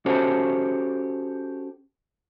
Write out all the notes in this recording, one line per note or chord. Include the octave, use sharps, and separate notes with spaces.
C#4 F#4 G4 A4 C5 C#5